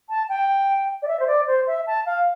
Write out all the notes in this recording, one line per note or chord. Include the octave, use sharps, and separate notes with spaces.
A5
G5
D5
E5
C5
D5
C5
E5
A5
F5